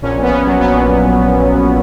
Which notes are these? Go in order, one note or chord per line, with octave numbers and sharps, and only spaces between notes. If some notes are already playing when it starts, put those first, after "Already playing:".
A#1 C#4
A#2
B3
A#1 C#4
F#3
A#1 B3
A#2